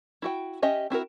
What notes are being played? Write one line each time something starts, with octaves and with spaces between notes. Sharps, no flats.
E4 F#4 G5
C#4 G4 D#5 E5
C4 E4 F#4 A#4